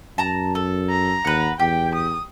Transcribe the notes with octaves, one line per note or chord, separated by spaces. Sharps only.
F#2 A5 A#5
A4
A#5
D#2 B4 F#5
E2 G4 G5
D#6